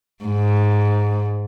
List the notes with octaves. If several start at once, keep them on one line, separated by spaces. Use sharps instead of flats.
G#2